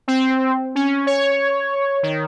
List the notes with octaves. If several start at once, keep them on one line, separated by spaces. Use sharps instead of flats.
C4
C#4
C#5
D#3